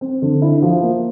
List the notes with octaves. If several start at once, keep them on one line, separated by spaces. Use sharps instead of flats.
C4
D3
E4
F3
A#3